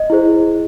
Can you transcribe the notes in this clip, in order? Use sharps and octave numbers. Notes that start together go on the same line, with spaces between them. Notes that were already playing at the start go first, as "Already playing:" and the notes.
Already playing: D#5
E4 G#4 C5